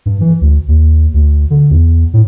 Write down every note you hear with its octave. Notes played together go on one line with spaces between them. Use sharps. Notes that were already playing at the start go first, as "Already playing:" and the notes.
G2
E3
D2
D#2
D2
D3
E2
A2